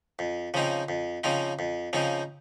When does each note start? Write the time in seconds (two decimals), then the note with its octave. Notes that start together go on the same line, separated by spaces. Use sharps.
0.19 F2
0.54 C#3 F3 C4 D#4
0.89 F2
1.24 C#3 F3 C4 D#4
1.59 F2
1.93 C#3 F3 C4 D#4